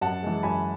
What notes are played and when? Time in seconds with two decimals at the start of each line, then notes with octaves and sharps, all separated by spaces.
0.01 F#2 F#5 A5
0.23 E3 G#3
0.43 F#2 G#5 B5